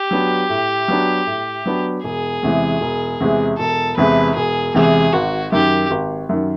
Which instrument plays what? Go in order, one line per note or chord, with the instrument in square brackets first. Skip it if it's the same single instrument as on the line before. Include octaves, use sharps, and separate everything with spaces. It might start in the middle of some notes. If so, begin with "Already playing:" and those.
Already playing: [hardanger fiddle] G4
[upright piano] F#3 B3 D4
A2
F#3 B3 D4
A2
F#3 B3 D4
[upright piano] E1 [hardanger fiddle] G#4
[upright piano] E2 C3 E3 G#3
E1
E2 C3 E3 G#3
[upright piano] E1 [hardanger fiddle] A4
[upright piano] E2 C3 E3 G#3 [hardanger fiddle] B4
[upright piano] E1 [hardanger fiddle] G#4
[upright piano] E2 C3 E3 G#3 [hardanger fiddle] G#4
[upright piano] G#1 [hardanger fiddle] F#4
[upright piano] F#2 D#3 [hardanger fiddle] G4
[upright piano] G#1
F#2 D#3